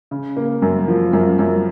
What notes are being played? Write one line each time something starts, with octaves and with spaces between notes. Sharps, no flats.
C#3
A#3
F#2
F3
F#2
F#2